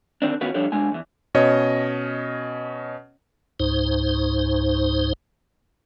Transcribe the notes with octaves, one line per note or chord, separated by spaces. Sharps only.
D3 D#3 C4 D4
D#3 B3 C#4 F4 F#4 B4
F3 G3 D4 A4 C#5
B1 G#3 D4 G#5
E2 E3
B2 C#4 C#5 D#5
C#2 G#2 D#4 C5